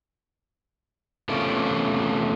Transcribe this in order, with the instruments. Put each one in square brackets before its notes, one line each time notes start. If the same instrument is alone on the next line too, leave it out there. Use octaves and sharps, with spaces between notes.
[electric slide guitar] E2 C3 A3 C#4 F4 D5